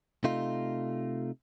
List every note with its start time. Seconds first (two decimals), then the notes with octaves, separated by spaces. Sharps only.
0.24 C3 A3 D#4 F4